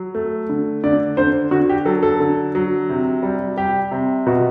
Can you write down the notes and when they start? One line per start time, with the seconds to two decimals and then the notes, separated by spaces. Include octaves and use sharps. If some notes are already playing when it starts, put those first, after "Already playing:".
Already playing: F#3
0.15 A3
0.49 D3
0.84 D3 D5
1.17 D3 C5
1.51 D3 F#4
1.69 G4
1.85 F#3 A4
2.03 A4
2.20 D3
2.55 F#3
2.90 C3
3.23 G3
3.57 G3 G4
3.91 C3
4.27 B2 F#4